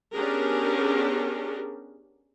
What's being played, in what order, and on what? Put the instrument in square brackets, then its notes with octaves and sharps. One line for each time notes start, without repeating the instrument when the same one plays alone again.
[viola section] B3 C#4 D4 G4 G#4 A#4